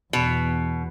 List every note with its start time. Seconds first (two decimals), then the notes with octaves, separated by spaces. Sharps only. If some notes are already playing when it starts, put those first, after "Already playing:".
0.13 E2 B2